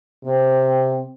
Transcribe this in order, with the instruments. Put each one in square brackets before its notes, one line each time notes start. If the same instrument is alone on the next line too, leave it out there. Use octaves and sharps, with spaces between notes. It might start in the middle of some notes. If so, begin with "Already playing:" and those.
[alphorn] C3 [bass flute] C4